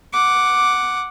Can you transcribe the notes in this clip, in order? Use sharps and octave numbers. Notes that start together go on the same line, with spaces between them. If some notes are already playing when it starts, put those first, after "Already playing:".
F#5 D6